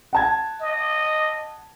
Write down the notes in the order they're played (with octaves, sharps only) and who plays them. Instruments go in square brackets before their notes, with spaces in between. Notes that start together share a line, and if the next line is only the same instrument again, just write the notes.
[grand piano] F#5 A5 G#6
[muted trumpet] D#5